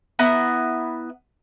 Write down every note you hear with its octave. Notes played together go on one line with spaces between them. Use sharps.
B3 E4 A#5